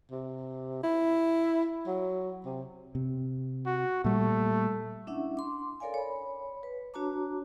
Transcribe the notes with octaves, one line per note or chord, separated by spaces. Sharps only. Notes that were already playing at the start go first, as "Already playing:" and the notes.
C3
E4
F#3
C3
C3
F#4
A#2 G3 A3
C#4 D4 E4 E5 F#5
C6 D6
A4 A#4 C#5 D5 F5 G#5
C#5 B5
B4
D4 F#4 C#5 A5 A#5 D6